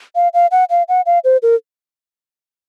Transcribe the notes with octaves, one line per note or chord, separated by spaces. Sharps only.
F5
F5
F#5
F5
F#5
F5
C5
A#4